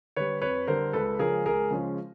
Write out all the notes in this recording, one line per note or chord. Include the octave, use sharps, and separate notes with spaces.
D3 G3 B4 C#5
F2 B4 C#5
D3 G3 A#4 C5
C#2 A4 B4
C#3 F3 G#3 C#4 G#4 A#4
C#2 G#4 A#4
C#3 F3 G#3 C#4